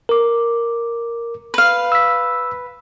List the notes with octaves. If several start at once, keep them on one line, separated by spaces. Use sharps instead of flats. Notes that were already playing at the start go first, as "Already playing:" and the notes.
A#4 D6
B4 F5
E6 B6